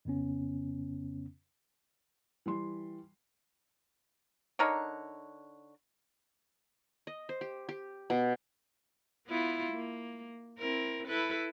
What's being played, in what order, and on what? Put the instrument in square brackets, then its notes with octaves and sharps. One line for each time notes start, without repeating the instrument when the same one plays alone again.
[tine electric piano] F2 C#3 B3 C#4
[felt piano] E3 G3 C6
[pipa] D3 D#4 A#4 C#5
[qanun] D#5
C5
G4
G4
B2
[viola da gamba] B3 E4 F4
A#3
C4 E4 A#4
E4 A4 B4